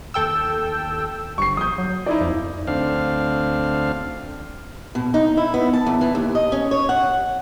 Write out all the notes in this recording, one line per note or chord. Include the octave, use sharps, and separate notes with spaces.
D#2 A4 G5 E6
G1 C#6 C7
A#1 D#6 G6
F#3
D#4 E4 D5
F2
D2 C4 D4 F5
B2
D#4
E4
B3
A5
E2
E3
D#2
D#5
C#4
C#5
F#5